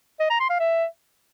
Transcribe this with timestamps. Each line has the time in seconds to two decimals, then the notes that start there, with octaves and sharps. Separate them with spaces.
0.20 D#5
0.30 A#5
0.40 C6
0.50 F5
0.60 E5